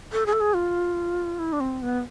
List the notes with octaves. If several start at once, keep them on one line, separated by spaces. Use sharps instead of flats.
A4
G#4
A4
G#4
F4
E4
D4
C4
B3